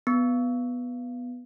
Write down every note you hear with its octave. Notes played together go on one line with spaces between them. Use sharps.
B3